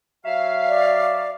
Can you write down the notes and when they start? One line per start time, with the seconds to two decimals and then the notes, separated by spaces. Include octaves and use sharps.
0.25 F#3 E5 F5
0.68 D5